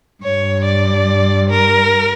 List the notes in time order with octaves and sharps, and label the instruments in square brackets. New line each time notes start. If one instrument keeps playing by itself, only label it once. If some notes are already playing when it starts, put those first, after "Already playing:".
[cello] G2 [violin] C#5
[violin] D5
A#4